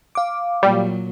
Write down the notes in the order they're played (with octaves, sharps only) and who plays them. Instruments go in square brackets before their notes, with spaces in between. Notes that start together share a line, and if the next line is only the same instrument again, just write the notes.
[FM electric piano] F5 D6
[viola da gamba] A#2 F#3 [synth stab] G3